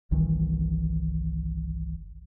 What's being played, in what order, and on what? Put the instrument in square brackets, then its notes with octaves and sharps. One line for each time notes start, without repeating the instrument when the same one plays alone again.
[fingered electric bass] G1 C2 D#3 E3